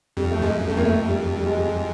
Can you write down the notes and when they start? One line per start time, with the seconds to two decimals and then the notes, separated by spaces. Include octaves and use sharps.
0.17 F2 G3
0.31 A3
0.42 F#2 G#3
0.68 F2 A3
0.77 A#3
0.85 A3
1.08 G3
1.36 G3
1.46 G#3